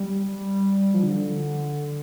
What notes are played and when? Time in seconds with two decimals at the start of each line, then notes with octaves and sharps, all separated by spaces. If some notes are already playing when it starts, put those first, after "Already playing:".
Already playing: G3
0.94 F3
1.03 D3